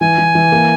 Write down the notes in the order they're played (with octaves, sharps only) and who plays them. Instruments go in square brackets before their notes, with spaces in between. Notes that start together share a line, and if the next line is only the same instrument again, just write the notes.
[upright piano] E3 [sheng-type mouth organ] G#5
[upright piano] E3
E3
A#3